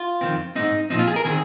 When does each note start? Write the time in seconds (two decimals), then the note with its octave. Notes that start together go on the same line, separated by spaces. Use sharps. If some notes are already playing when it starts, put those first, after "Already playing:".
Already playing: F4
0.21 F2 D#3 C4
0.55 G#2 G#3 C4 D#4
0.90 A#2 F3 C4 D#4
0.99 F4
1.07 G#4
1.16 A#4
1.25 D#3 C4 G#4